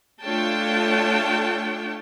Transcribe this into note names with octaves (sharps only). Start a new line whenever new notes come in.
A3 D4 F4 C#5 G5 A5